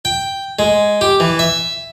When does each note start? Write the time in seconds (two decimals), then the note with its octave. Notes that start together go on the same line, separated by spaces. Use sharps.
0.05 G5
0.59 G#3
1.01 G4
1.20 E3
1.39 E5